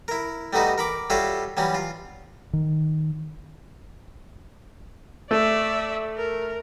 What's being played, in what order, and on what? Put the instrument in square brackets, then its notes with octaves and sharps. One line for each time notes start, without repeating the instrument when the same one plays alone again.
[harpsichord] E4 A#4
G3 A3 B3 D#4 F#4
A#4 B5 D6
G3 F4 F#4 A4 C#5 E5
E3 F#3 G3 C#4
F4
[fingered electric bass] D#3
[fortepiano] A3 [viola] D5 E5
[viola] A#4